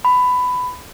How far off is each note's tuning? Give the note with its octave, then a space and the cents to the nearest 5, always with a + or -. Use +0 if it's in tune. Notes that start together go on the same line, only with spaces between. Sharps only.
B5 +15